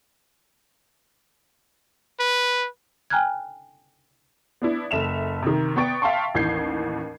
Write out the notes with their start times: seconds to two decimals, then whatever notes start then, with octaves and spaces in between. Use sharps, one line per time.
2.20 B4
3.10 G5 G#5 A#5 F6 F#6 G#6
4.62 B3 D4 E4
4.91 F#1 A4 E5 E7 F7
5.42 C3 D#3
5.76 B3 D5 G5 C#6 A6 D7
6.02 E5 F5 G5 A5 C6 C#6
6.34 A1 D#2 E3 G6 G#6 C7